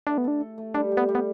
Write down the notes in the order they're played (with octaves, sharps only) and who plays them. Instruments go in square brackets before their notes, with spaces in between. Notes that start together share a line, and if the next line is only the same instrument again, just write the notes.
[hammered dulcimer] A3 [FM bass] D4
[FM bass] B3
[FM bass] D4 [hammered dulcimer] A4
[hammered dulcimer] A4
A3
[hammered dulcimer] G3 [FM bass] D4
[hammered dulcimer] G3
[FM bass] B3
[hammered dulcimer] G3
[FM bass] B3